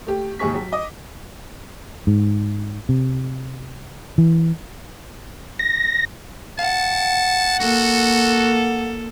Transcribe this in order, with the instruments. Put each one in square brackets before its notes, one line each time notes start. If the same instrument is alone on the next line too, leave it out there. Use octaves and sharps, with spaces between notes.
[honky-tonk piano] A3 G4
D#2 G#2 G4 G#4 C#6 B6
F#3
D#5 D6
[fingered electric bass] G#2
C3
E3
[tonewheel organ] A#6
[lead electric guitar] F5 F#5 [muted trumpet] A5
[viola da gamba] A#3 A4 [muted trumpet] F#4